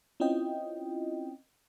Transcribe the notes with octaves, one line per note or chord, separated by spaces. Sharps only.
C4 C#4 E4 F4 D#5 G5